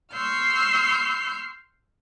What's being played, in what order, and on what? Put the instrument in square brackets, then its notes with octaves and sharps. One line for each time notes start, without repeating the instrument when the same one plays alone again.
[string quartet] C6 C#6 E6 F6 G6